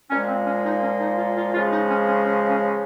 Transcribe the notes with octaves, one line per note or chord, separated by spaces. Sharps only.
A#2 F3 G#3 C#4
C4
C#4
D#4
C#4
D#4
F4
F4
C#3 F3 G#3 F4
D#4
C#4
C#4
C#4
C#4